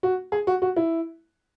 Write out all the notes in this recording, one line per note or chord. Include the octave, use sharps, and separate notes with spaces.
F#4
G#4
F#4
F#4
E4